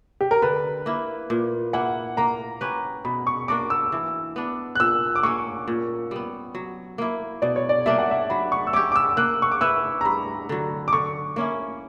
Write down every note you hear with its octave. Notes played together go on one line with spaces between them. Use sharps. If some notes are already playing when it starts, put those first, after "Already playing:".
G4
A#4
D3 B4
A#3 E4
A#2
A#3 E4 F#5
A#3 A#5
C#4 G4 B4
B2 B5
C#6
A#3 D4 F#4 D6
E6
E3
B3 D4
F#6
A#2 E6
D6
A#3 C#4 C#6
A#2
G3 B3
F#3
A#3 E4
B2 D5
C#5
D5
G3 A#3 D4 E5
F#5
E5
F#3 B5
C#6
E6
C#4 G4 D6
D6
E6
A#3 F#6
C#6
D6
E4 B4 E5 E6
A#5
G2 B5
D3 F#3
D6
D3 C#6
A#3 C#4 E4